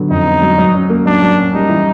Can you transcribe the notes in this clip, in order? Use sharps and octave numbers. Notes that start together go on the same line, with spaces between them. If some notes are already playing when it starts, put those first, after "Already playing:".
Already playing: D3 F#3 B3
F2 D#4
B3
F#3
F#3
C#4
A#3
F#3 D4
F#3
C#4
G3 D#4
E3